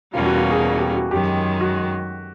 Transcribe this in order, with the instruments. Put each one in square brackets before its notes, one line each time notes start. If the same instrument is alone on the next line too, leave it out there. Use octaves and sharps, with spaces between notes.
[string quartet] E2 B2 G3 A#3 C#4 [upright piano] F4
[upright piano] F#4
F#4
G#4
G#4
G4
F#4
[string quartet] F#2 D#3 G#3 [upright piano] G4
[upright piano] F#4